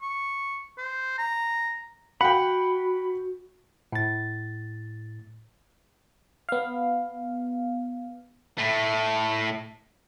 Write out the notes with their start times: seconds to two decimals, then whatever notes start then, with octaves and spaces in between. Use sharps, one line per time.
0.02 C#6
0.78 C5
1.18 A#5
2.21 F#4 F#5 G5 B5
3.92 A2 A6
6.49 B3 F5
8.58 A2 A3